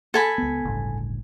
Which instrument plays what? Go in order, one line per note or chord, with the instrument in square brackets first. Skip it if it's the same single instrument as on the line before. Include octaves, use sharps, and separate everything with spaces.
[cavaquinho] A4 G#5 B5
[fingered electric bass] C#2 B3
G1 C#2 A2